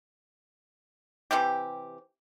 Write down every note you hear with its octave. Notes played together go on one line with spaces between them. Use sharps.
C3 E3 C4 G4